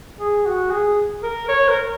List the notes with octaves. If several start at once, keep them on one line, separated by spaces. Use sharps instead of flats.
G#4
F#4
G#4
A#4
C#5
A#4